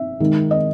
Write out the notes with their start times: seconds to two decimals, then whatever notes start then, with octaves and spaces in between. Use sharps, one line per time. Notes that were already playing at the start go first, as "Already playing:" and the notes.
Already playing: E5
0.20 D#3 G#3 D#4
0.51 D#5